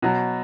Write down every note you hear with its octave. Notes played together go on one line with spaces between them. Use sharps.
B2 F#3